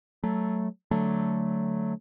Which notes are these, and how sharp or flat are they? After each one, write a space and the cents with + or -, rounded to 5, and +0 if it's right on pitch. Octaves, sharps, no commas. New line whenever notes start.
F#3 +15 A3 +0
D3 -5 F#3 +0 A3 +0